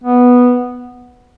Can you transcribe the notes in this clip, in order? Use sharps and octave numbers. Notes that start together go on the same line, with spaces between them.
B3